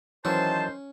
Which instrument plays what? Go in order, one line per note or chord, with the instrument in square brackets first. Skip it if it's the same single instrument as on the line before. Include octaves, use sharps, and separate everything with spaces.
[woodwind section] D#3 C5 [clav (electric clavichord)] E3 F#3 [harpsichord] C#4 [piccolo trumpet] A5